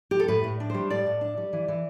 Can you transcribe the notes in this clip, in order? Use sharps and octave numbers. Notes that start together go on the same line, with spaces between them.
G4
A4
A2 B4
A2
D4
G3 C5
A2 D5
A2
D4
G3
E3
E3